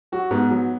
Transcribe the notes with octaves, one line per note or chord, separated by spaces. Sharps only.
F#3 F#4
G#2 B3
F#3